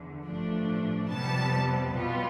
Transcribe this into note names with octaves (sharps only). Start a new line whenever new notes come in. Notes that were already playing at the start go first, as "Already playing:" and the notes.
Already playing: E2 D3
A1 G2 F3 A3 D4
F2 C3 G3 B3 A5
B1 B2 G3 B3 F4